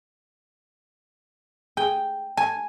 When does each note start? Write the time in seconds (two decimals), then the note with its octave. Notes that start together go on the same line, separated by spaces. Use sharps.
1.77 G#4 G5
2.37 G#5 A5